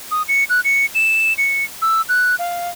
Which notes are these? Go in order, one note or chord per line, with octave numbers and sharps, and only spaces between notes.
D#6
C#7
F#6
C#7
E7
C#7
E6
F#6
F5